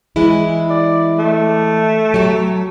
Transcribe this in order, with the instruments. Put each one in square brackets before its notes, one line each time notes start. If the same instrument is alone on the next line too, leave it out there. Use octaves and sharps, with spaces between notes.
[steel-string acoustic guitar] E3 G#3 E4
[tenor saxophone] D5
A3
[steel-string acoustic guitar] F#3 G4